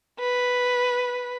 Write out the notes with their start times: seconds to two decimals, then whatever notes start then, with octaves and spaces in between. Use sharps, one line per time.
0.20 B4